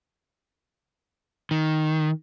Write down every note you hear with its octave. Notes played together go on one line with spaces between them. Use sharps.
D#3